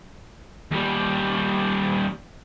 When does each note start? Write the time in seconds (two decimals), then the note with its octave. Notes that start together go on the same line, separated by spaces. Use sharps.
0.72 D#2 G3